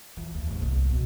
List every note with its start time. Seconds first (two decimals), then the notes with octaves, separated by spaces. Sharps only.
0.17 E3
0.35 D#2
0.47 D#2 G#2
0.62 C2
0.91 B2